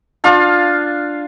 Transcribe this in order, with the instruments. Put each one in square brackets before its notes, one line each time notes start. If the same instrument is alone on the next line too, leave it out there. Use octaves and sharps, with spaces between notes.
[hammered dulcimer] D4 F4 F5 A5